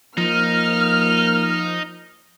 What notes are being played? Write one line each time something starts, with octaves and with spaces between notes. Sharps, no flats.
F3 A#3 D#4 F6